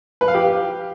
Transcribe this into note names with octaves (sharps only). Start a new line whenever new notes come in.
B4
F5
G4